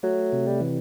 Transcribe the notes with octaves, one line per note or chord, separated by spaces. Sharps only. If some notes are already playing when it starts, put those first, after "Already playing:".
F#3 A3
C3
G3
E3